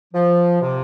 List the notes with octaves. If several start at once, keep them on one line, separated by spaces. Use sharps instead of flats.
F3
C3